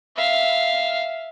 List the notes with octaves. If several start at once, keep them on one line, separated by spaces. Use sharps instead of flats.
E5 F5